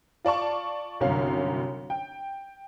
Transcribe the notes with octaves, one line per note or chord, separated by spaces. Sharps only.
F4 D5 A5 C#6
G1 C2 F#2 C#4 F5
G5